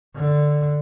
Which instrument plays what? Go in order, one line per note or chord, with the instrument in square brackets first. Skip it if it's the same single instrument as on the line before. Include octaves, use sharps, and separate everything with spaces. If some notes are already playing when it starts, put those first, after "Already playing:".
[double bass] D3